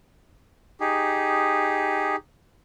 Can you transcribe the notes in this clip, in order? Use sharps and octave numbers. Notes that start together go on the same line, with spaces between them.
D#4 G4 G#4